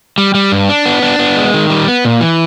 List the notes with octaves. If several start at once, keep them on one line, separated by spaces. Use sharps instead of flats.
G3
G3
G2
D4
B3
D4
B3
G#3
D#3
G3
B3
A#2
E3